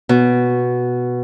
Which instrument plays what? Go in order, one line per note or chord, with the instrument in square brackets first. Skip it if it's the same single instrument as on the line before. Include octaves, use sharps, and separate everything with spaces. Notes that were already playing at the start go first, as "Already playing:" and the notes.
[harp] B2